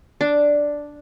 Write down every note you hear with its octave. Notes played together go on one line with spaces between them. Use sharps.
D4